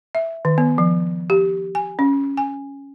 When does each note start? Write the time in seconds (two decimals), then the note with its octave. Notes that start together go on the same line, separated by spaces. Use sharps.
0.15 E5
0.45 D#3
0.58 B3
0.78 F3
1.30 G4
1.75 G#5
1.99 C#4
2.37 G#5